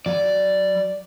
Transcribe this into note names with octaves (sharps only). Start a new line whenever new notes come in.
F#3 D5